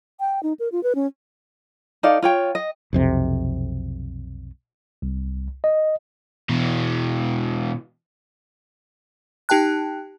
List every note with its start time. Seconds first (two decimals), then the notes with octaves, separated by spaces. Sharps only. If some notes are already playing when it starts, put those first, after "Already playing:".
0.20 G5
0.43 D#4
0.60 A#4
0.72 F4
0.83 B4
0.95 C#4
2.03 D#4 A4 D5 F5
2.22 F4 C#5 G5
2.55 D#5
2.93 B1 F2 C3
5.02 C2
5.64 D#5
6.49 B2 E3
9.49 D#4 G4 G5 A5 F#6